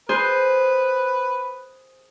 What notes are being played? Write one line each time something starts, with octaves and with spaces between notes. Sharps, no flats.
G#4 B4 C5